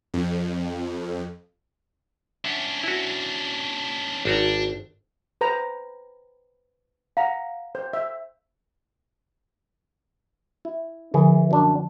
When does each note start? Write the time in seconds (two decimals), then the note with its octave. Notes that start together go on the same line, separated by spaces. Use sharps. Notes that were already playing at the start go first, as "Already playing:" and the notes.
0.14 F2
2.45 C#4 D4 E5 F#5
2.84 E4 F#4
4.25 G#1 D4 F#4 A#5
5.41 B4 C5 A#5
7.17 F5 F#5 A#5
7.75 C5
7.93 E5
10.65 E4
11.14 D3 E3 F3 G#4
11.51 F#2 D4